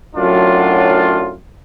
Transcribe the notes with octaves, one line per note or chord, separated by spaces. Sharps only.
F#2 A2 F#3 D4 F4